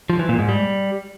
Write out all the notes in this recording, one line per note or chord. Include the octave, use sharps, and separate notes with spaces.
F3
E3
A#2
G#2
G3